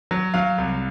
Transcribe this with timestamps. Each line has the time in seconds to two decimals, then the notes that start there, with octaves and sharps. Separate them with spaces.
0.11 F#3
0.34 F#3 F5
0.58 C2